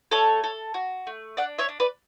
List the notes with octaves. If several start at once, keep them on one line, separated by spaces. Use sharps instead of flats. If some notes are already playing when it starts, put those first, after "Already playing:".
A3 A4 C#5
A4
F#4
A3
D4 D5 F#5
C#5 E5
D4
B4 D5